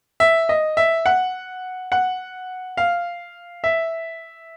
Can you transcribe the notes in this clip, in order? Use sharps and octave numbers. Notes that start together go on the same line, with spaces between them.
E5
D#5
E5
F#5
F#5
F5
E5